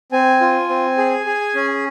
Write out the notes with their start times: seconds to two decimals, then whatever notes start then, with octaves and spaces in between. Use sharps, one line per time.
0.12 C4 G#5
0.41 F4
0.69 C4
0.98 G#4
1.26 G#4
1.55 C#4